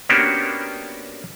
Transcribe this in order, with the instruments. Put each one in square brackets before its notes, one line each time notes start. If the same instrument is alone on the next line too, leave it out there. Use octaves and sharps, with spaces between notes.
[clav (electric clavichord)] A#3 B3 C#4 D4 F#4 G4